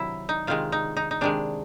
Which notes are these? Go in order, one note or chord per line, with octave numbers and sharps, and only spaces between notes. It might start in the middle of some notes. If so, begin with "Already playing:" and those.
Already playing: C3 D#3 F#3 E4
D#4
C3 D#3 G#3 F4
D#4
D#4
D#4
C3 D#3 G#3 D4